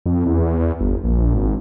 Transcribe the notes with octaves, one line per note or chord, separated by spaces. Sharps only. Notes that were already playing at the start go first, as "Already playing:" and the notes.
F2
E2
G1
A#1
G#1